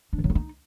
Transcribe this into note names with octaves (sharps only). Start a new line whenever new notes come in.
D4
E3
F#3
F4
D#4